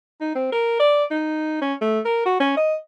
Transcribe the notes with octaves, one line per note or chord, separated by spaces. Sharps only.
D#4
C4
A#4
D5
D#4
C#4
A3
A#4
F#4
C#4
D#5